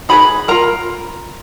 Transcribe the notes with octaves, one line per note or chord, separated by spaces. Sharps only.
D#4 G#4 B4 B5
F4 A#4 A#5